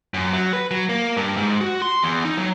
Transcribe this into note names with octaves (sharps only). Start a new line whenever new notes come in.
F#2
F#3
B4
F#3
A#3
G2
G#2
F#4
C6
E2
D#4
F#3